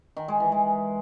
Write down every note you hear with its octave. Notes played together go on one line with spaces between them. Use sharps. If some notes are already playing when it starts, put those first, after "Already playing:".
D#3
G#3
E3
G#3